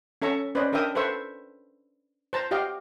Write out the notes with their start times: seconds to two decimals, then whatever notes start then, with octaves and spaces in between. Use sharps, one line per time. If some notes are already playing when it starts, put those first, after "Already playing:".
0.22 C#4 A4 E5 A#5 C#6
0.55 C#4 B4 C5 D5 D#5
0.73 D4 A#4 D#5 E5 G5 D#6
0.95 A4 B4 C5 E5 C#6
2.33 C5 A5 A#5
2.51 F#4 G4 D#5 F5 G5